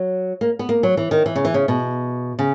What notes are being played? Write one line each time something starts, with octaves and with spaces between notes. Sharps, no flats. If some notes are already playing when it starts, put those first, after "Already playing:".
Already playing: F#3
A#3
B3
A#3
F#3
E3
D#3
E3
C#3
E3
C#3
B2
C#3